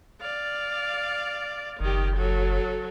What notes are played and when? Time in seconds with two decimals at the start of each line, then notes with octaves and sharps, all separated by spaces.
0.21 D5 F5
1.80 F#1 D#3 G4
2.17 F#3 A4